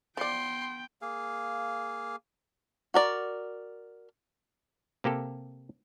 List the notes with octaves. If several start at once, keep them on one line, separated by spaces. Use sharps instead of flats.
F3 B3 D5 G5 C6
A#3 G#4 F5
F#4 A#4 D5
C3 A#3 G4 A4